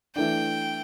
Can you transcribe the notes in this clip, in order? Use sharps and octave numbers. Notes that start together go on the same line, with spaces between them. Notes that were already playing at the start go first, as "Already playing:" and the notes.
E3 A3 D4 G5